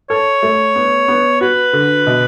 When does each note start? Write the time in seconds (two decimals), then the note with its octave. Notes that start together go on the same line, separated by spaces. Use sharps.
0.10 A4 C#5
0.43 A3
0.76 B3
1.08 B3
1.41 F#4 B4
1.73 D3
2.07 B2